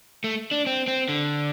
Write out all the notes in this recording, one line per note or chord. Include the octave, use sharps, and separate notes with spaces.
A3
D4
C4
C4
D3